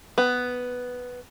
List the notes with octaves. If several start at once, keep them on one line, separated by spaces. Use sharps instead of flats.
B3